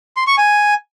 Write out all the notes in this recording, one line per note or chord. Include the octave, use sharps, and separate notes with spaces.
C6
C#6
G#5